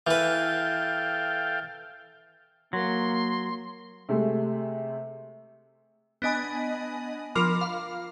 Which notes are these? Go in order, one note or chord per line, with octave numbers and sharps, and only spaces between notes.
E3 A4 B4 F5 G5
F#3 A#3 C6
C3 G#3 A3
B3 D4 D#5 G#5 B5
F3 F4 A#4 B5 D6 F6
F5